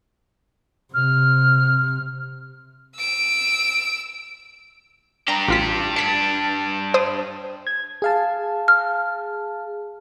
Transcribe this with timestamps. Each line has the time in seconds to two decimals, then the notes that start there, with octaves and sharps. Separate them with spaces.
0.94 C3 F6
2.97 E6 D7
5.28 D4 G4 A#5
5.48 A1 F4 B6
5.96 G2 D4 B6 C#7
6.94 C5 D#6
7.67 G#6
8.02 G#4 F5 A5
8.68 F6